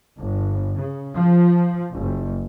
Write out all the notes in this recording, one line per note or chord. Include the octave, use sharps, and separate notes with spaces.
G1
C#3
F3
F#1